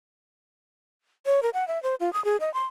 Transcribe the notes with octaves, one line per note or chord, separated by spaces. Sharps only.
C#5
A#4
F#5
E5
C5
F4
D#6
G#4
D#5
C6